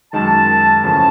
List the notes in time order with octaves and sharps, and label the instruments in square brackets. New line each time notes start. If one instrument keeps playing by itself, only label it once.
[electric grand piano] F#2 D#3 G#3 [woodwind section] A5
[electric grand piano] E2 C#3 F3 A3 C#4 [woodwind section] A5